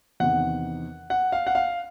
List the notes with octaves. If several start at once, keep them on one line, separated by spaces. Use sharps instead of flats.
E2 C3 D#3 F#5
F#5
F5
F#5
F5